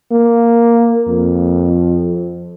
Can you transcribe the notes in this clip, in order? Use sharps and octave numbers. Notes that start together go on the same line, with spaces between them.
A#3
F2